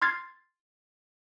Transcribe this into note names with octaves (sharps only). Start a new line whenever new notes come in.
C6 F6 G#6 A6 C7